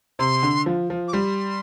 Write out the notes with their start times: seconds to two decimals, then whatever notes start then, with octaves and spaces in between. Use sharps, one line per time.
0.19 C3 C6
0.43 D3
0.66 F3
0.90 F3
1.08 D6
1.13 G3 C6